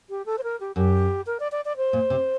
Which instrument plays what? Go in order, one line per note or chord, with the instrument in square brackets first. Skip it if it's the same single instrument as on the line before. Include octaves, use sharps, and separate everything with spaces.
[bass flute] G4
A4
C5
A#4
G4
[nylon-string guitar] F#2 [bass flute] G4
[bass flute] A#4
D5
D5
D5
C5
[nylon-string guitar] A#2
C3